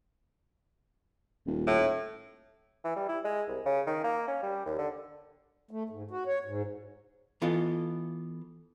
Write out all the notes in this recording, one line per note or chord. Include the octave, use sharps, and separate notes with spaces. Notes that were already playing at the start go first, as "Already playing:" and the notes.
D#1
A2
E3
G3
E4
G#3
C2
C#3
D#3
A#3
C#4
G3
D#2
D3
A3
G#2
F#4
C#5
G#2
E3 B3 F4 A4 D#5